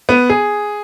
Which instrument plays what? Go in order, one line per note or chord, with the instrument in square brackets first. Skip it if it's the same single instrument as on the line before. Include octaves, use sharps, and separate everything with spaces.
[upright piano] B3
G#4